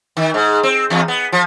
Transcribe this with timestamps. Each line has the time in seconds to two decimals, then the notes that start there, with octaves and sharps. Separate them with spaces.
0.17 D#3
0.34 G#2
0.63 C4
0.90 E2
1.08 B3
1.32 F3